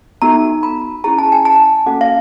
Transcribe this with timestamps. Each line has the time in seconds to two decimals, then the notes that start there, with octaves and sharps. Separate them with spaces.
0.22 B3 D#4 F#4 A4 A#5
0.63 B5
1.04 C#4 E4 G#4 A#5
1.19 A5
1.32 G#5
1.45 A5
1.86 A#3 C#4 F#4 A4 F#5
2.01 F5